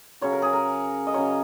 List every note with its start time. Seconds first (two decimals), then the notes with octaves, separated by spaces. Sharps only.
0.21 C#3 F#3 C#5
0.33 A#4
0.42 G#4
0.53 A#4
1.07 D#5
1.14 C#3 F#3 C#5